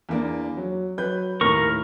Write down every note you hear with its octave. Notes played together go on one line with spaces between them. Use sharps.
E2 A#3 D4
F#3
F#3 B4 G6
D#2 A2 A#4 C#6